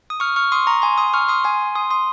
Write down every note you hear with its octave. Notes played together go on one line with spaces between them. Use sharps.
D#6
C#6 F6
C#6 F6
C6 D#6
A#5 C#6
G#5 C6
C6 D#6
C#6 F6
C6 D#6
G#5 C6
C6 D#6
C6 D#6